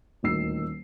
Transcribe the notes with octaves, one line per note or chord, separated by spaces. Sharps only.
D#1 D2 D#3 E6 C7